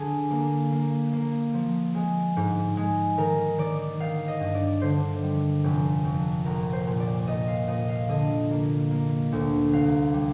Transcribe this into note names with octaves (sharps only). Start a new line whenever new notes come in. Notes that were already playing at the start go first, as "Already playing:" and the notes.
Already playing: D3 G#4
A#3
A#3
A#3
F3
G#3
G#2
G#3
D#3 A#4
D#3 D5
D#3 F5
D#5
G2
D5
D3 C5
G3
F1
F2
A#1 A#4
C5
A#2
D5
A#2 D#5
F5
A#2 D#5
F5
D3 D#5
A#3
A#3
D2
C2 F5
G3